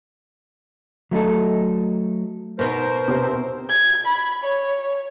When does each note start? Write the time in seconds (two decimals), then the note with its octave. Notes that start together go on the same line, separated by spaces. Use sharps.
1.11 F#3 A3 D#4 A4
2.59 B2 B3 D#4 A#4 C5
3.08 C3 C4
3.70 G#6
4.06 B5
4.43 C#5